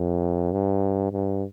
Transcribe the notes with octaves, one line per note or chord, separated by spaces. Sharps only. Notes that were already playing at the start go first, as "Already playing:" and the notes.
Already playing: F2
G2
G2